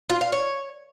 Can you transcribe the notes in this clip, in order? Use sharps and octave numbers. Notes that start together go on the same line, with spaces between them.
F4
F5
C#5